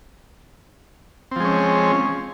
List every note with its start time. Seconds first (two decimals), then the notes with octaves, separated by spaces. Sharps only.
1.31 C4
1.36 F3
1.40 G#3
1.45 C#4